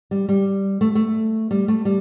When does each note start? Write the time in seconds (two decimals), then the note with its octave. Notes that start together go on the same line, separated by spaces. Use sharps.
0.11 G3
0.29 G3
0.81 A3
0.95 A3
1.51 G3
1.68 A3
1.85 G3